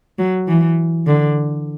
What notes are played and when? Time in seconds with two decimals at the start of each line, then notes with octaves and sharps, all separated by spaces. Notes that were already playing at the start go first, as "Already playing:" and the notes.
0.19 F#3
0.48 E3
1.07 D3